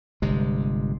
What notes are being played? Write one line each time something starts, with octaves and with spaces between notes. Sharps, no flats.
G1 C3 G#3